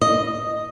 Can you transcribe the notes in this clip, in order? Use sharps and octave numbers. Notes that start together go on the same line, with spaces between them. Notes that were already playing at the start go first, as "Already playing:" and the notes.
D#5